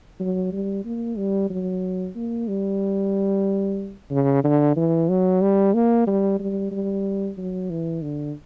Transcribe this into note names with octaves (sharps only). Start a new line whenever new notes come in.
F#3
G3
A#3
G3
F#3
A#3
G3
C#3
D3
E3
F#3
G3
A#3
G3
G3
G3
F#3
E3
D3